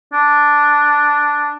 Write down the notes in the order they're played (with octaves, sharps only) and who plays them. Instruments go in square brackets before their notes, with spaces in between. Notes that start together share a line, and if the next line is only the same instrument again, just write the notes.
[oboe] D4